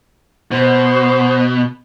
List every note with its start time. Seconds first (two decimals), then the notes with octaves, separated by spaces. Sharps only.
0.51 B2 C5